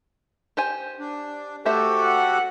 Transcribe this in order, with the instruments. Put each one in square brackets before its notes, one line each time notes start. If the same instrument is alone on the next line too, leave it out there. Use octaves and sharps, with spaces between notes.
[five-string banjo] G4 C5 G#5
[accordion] D4
[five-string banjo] A3 C5 E5 [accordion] F#4 G4 A4
[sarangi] F#5